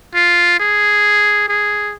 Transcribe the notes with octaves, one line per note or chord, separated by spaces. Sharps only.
F4
G#4
G#4